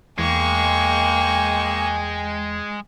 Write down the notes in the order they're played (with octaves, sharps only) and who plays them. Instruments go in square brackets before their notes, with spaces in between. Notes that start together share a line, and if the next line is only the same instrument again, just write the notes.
[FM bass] E2 [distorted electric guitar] G#3 [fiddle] A#3 C#6 [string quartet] G5 G#5